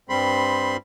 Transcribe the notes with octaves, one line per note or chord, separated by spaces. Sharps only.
G2 G3 C4 B5 C6